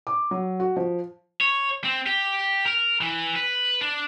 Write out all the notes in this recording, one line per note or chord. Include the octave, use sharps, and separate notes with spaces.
D6
F#3
F#4
F3
C#5
C4
G4
A#4
E3
B4
D4